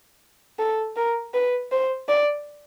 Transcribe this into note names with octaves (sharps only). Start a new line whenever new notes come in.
A4
A#4
B4
C5
D5